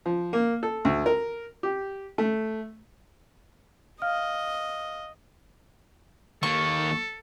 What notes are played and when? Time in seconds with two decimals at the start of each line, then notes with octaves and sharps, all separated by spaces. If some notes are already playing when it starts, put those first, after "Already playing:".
0.06 F3
0.33 A#3
0.63 A4
0.85 D2
1.06 A#4
1.63 G4
2.18 A3
4.02 D#5 F5 F6
6.43 D#3 A#3 A4 C#6